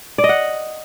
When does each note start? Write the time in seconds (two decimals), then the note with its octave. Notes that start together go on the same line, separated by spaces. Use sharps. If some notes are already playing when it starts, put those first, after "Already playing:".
0.18 D5
0.24 D#5
0.29 F#5